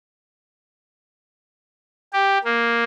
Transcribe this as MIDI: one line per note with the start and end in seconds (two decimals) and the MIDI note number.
2.13 2.38 67
2.44 2.84 58